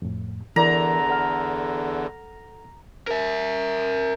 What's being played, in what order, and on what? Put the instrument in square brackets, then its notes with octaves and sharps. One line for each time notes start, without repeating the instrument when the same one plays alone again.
[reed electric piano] F2 A2
[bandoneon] E2 D3 [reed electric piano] E3 A#4 D5 [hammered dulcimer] A#5
[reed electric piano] A4 F#5 F6
[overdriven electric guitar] A#4 E5